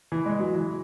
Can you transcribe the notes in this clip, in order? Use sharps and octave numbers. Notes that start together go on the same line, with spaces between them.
E3
G#3
F#3
E3